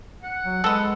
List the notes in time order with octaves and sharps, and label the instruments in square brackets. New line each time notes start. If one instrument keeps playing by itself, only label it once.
[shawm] F#5
[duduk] F#3
[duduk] G#3 [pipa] B3 A4 [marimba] E6